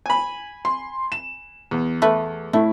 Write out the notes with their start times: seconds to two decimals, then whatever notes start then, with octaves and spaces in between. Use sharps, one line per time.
0.06 G#5 B5
0.65 C6
1.12 E7
1.71 E2
2.02 A3 B4
2.53 A2 A3 E4